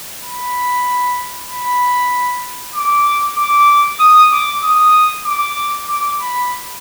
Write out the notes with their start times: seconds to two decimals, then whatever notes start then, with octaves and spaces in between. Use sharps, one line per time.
0.24 B5
1.50 B5
2.75 D6
3.37 D6
4.00 D#6
4.32 D6
4.63 D#6
5.26 D6
5.89 D6
6.20 B5